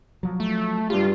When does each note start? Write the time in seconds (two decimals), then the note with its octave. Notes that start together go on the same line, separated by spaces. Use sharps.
0.23 F3 F#3
0.40 A3
0.90 G2 G3 F4